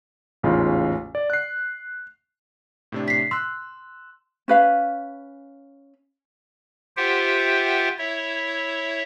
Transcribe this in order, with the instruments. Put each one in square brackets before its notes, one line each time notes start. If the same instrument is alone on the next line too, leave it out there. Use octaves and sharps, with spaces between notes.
[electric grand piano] A1 E2 G#2 C#3 F4
D5
F#6 C7
A2 C3 D4
[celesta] B6 C7
[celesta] C6 [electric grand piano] E6 F#6
[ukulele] C#4 B4 F5
[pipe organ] F4 G4 C5 E5 F#5 G5
E4 C#5 E5